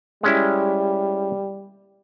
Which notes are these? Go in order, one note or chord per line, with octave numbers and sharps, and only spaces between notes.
G3 G#3 C#4 E4